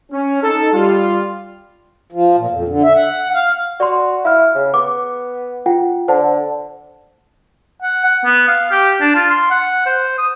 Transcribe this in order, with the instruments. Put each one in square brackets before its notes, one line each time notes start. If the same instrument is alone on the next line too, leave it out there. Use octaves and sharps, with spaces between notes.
[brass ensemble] C#4
D#4 A4
G3 F4
[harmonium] F3
A#2
F2
D3
E5
F#5
F5
[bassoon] F#4 [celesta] D5 C6
[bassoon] E4 [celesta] F5 F6
[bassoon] C#3
[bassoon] B3 [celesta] D6
[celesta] F4 F#5 G5
[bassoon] D3 [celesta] C5 F#5 A5
[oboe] F#5
F#5
B3
F5
G4
D4
F4
C6
F#5
C5
D#6